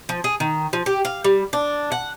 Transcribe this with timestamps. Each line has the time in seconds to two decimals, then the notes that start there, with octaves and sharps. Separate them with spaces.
0.09 F3
0.24 G#4
0.40 D#3
0.73 F3
0.86 G4
1.05 F5
1.24 G3
1.53 D4
1.92 F#5